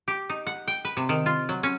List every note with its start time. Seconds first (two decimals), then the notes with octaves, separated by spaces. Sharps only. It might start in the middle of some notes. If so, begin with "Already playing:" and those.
0.08 G4
0.30 D#4
0.47 F#5
0.68 G5
0.85 B4
0.97 C3
1.09 D#3
1.26 F4
1.49 F#3
1.63 C#4